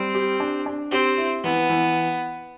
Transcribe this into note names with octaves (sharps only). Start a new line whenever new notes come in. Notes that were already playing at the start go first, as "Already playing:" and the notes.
Already playing: G3 C4
G4
D4
D4
C4 G4
E4
E3 B3
E3